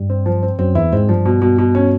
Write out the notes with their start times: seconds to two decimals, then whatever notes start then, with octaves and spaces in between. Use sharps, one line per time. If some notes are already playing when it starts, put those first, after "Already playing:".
Already playing: G2 G3
0.10 C4
0.26 F3
0.43 C4
0.59 F#2 F#3 C4
0.75 E2 E3 E4
0.93 G#2 G#3 C4
1.09 G2 F3 G3
1.26 B2
1.42 B2
1.58 B2
1.75 C#4